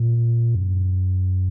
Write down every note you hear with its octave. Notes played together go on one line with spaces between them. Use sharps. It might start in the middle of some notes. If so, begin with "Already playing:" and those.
Already playing: A#2
F#2